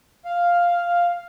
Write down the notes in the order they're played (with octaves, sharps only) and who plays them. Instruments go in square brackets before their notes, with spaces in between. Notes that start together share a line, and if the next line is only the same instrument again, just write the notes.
[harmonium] F5